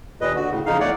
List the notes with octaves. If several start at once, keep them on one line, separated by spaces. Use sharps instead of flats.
D#2 A#2 B4 D#5
D3 F#4
A2 C#3
F2 C#3 D#4 F5
E2 A3 C#5 D5 F#5